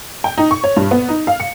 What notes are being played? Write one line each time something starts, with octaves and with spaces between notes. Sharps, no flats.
G5
D#4
C#6
C#5
G2
B3
D#4
F5
C#7